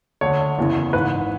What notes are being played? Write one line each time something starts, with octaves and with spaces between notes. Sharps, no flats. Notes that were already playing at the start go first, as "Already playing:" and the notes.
D2 D3 C#5
F#1 E2 C#3 E3
G#1 G#2 E3 B4